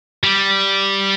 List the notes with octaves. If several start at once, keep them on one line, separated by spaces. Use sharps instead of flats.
G3